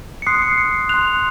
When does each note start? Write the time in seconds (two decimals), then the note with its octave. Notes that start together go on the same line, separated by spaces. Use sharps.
0.22 C#7
0.27 C6 D#6 F#6 C7
0.42 C#7
0.58 C#7
0.89 C6 F#6 F7